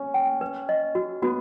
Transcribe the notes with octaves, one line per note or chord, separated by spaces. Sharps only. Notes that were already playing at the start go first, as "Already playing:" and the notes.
Already playing: C#4
G5
B4
D#5
F#4
B3 F#4